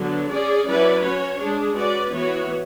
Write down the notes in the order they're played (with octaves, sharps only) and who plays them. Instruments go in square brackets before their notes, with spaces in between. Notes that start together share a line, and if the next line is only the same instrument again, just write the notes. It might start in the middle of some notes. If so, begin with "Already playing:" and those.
Already playing: [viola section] D3 F#3 B3
C#4 G#4 D5
F#3 C#4 E4 B4 D5
C#4 F#4 C#5
G#3 D4 G#4
C#4 F#4 B4 D5
E3 B3 F#4 C#5